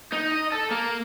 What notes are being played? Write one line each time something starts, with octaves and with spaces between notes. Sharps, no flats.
D#4
D#5
A4
A#3